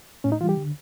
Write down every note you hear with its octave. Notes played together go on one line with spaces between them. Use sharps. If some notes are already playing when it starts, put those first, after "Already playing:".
A2 C#4
D#4
E3 G3 F4
G4
D3